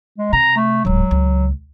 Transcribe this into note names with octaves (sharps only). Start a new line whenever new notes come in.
G#3
C3 A#5
A3
D1 G#2 F#3
C#2